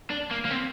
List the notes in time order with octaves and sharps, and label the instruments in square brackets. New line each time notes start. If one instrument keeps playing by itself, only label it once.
[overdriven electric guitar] D4
A#3
A#3
C4